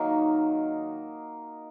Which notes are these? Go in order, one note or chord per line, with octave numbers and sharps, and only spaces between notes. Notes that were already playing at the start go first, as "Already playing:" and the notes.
Already playing: D#3 F#3 A#3 D#4